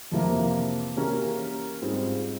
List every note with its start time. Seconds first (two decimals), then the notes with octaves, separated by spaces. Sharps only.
0.12 F2 C3 E3 A#3
0.97 E3 A#3 C#4 G4 A#4
1.81 G#2 G3 C4 F4 G#4